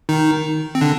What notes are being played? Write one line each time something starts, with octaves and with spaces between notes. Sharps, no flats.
D#3 D#4
C4
D3 D4